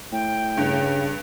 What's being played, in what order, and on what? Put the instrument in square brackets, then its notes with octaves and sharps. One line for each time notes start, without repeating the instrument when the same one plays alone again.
[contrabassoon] A2 [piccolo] G5
[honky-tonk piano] G2 [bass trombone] C#3